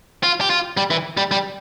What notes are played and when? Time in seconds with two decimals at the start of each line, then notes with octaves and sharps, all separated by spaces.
0.23 F4
0.41 G4
0.50 F4
0.77 G3
0.91 E3
1.17 G3
1.31 G3